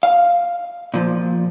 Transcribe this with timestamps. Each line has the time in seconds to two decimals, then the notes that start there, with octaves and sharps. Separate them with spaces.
0.03 F5
0.94 A#2 F3